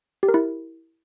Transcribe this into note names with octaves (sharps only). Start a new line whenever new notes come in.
G4
A#4
E4